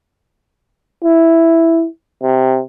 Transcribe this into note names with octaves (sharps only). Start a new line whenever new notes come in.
E4
C3